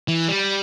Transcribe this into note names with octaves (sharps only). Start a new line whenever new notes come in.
E3
G3